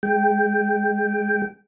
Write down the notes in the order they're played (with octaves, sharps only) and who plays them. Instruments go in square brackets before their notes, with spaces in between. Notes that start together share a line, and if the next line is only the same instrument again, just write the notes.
[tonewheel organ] G#3 G5